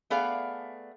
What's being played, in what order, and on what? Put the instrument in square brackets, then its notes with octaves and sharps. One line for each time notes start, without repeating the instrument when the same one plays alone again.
[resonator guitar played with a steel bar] A3 B3 G#4 D5 F5